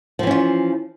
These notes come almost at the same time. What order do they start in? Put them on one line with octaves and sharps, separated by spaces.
F3 E3 C#4 F4